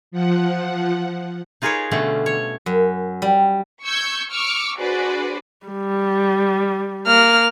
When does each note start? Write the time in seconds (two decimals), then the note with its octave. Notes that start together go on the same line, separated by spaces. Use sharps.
0.11 F3 F#5
1.62 D#4 F4 G#4 A#4 B4 C#5
1.91 B2 D3 G3 A3 C#4
2.26 C#5
2.66 F#2
3.22 G3
3.84 C#6 E6 G6 G#6
4.31 C#6 D6 E6 F6
4.79 D4 F#4 G#4 B4 C5 D5
5.66 G3
7.07 A#3 F6